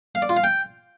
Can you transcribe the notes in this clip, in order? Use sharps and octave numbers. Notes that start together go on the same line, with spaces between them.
F5
D5
F4
F5
G5